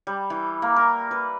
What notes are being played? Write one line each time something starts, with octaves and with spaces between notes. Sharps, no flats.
G3
E3
A#3
A#4
B4